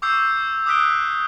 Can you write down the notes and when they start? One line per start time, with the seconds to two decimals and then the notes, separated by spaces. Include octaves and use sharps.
0.02 C#6 D6 E6 G6 C7
0.66 D6 D#6 F#6 B6 D7 G7